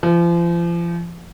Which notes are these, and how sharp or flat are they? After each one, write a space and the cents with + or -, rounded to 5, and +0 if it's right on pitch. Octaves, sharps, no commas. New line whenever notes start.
F3 -35